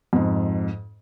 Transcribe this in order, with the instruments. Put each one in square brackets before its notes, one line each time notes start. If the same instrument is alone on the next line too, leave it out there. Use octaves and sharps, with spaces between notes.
[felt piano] F2 G#2